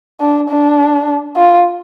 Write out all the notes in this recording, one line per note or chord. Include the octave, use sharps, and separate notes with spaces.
D4
D4
F4